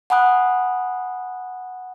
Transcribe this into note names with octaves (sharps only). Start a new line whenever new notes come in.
F#5 G#5 B5 D#6 F#6